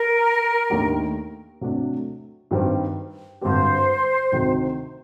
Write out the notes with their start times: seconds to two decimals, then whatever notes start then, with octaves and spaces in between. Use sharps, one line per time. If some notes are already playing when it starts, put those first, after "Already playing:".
Already playing: A#4
0.70 D#2 D#3 A3 D4 G4
1.61 C3 F#3 A3 D4
2.51 G2 D#3 G3 C4
3.41 G2 D3 F#3 C4 G4 C5
4.32 D2 C3 D#3